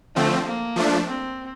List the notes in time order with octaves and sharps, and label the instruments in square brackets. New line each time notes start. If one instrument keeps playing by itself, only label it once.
[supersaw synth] D3 F3 C4 [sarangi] A3
[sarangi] A#3
[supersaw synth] F3 A3 D4
[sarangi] C4